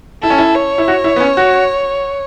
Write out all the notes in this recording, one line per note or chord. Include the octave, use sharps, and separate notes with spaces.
E4 A4
C#4
E4
C#5
E4
F#4
E4
B3
C#4
F#4